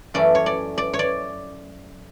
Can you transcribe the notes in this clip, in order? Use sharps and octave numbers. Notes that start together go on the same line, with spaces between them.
F#2 E3 A3 C#4 D5
C#5
D5
D5
C#5
D5